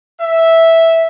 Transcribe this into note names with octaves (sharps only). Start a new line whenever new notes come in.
E5